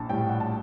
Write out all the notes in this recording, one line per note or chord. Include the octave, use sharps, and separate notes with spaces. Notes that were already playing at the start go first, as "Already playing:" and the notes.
Already playing: A#1 A5
A2 G3 G5
F#5
A5